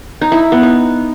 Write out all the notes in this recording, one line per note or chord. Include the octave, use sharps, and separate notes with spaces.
D#4
E4
B3
D#4